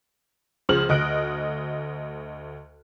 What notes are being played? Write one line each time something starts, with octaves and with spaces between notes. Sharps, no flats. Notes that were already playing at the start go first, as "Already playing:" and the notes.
C#2 C#3 F3 C5 F6 F#7
D2 D#5 F#6 D7